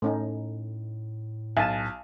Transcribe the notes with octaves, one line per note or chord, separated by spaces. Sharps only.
A2 A3 C#4 D#4
B1 G#5 A5